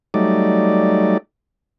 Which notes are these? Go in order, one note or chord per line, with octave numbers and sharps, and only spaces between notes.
F#3 G3 A3 D#4 D5